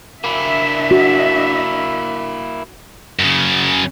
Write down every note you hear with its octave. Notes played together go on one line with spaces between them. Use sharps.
A#3 D4 E4 E5
F#4
F#2 C#3